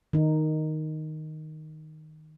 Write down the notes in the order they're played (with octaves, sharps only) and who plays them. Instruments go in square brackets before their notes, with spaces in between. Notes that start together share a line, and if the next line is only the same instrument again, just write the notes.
[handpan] D#3 D#4